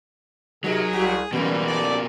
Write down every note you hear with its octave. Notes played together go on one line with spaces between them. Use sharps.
C3 F#3 D#4 G#4 A#4
C2 F#4 G4
F2 G#2 B2 E3 G3 A#3
G4 A4 D5